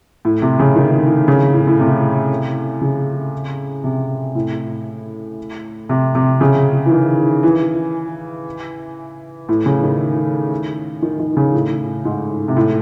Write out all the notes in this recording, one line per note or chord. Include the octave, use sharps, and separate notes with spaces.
A2
C3
C#3
D#3
C#3
A2
A2
C3
C#3
C3
A2
C3
C3
C#3
E3
D#3
E3
A2
C#3
D#3
D#3
D#3
C#3
A2
G#2
C3
A2